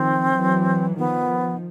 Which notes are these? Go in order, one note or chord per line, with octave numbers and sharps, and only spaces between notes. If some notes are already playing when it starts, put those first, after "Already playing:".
Already playing: D#3 F3 C4
E3 F#3
D#3 F3 B3